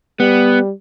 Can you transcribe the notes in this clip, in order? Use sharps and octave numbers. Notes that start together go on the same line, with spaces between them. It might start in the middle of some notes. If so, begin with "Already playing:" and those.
G3 B3